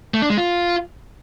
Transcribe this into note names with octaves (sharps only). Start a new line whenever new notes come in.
A3
D4
G#3
F4